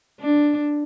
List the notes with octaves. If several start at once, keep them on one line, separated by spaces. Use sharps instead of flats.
D4